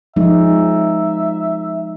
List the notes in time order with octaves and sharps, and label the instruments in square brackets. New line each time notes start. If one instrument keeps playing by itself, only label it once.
[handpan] F3 G#3 D#4 [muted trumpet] E5